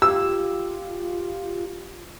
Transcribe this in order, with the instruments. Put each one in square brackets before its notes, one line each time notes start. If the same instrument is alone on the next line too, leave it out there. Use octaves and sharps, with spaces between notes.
[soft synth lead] F4 [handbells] G4 [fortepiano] E6